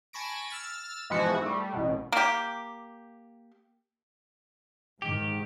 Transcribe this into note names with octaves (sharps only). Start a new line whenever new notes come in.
G#5 A5 B5 C#6 A#6 D7
E6 F6 A6
G#2 B2 E3 F3 B3 F#4
G3 A3
A1 B2
A#3 G4
G#2 D#3 G4